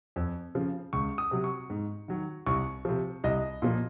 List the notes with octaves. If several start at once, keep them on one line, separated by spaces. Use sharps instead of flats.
F2
C#3 F3
C#2 C#6
D#6
C3 F#3
C#6
G#2
D#3 F#3
C2 C#6
C3 F3
C2 D#5
A#2 F3